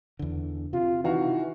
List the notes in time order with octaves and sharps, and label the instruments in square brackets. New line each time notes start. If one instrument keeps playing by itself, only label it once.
[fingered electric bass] E2 D3
[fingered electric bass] C3 [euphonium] F4
[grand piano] D#3 F#4 F5 [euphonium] E3